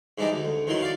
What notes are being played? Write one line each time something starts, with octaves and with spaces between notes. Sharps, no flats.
G#2 E3 D4 D#4 G4
D2
D2
E2 D#3 E3 F#3 C6
D5 F5 C#6